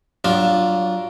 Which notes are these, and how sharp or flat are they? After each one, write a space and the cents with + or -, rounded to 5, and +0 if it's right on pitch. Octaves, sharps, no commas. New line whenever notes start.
F#3 +20 D4 +0 F4 +0